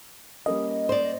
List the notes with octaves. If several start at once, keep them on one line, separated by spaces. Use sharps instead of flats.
G3 A#3 C#4 D#5
C5 D5